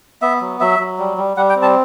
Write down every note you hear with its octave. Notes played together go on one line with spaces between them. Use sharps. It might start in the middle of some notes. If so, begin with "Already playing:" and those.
B3 E5
F#3
F#3 E5
F#3
G3
G3
G3 F#5
G5
C4
A5